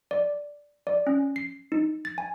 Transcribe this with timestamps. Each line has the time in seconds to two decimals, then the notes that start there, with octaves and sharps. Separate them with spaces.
0.11 D5
0.87 D5
1.07 C#4
1.36 C7
1.72 D#4
2.05 A6
2.18 G#5